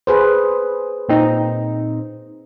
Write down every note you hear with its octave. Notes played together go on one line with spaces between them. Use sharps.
G#4 B4 C5
A#2 C4 D#4